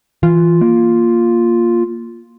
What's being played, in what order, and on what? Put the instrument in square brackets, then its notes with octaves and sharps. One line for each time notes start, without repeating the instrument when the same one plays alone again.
[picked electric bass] E3 [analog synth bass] F4
[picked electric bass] A#3